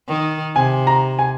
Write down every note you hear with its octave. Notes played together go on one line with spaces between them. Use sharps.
D#3
C3 G#5
A#5
G#5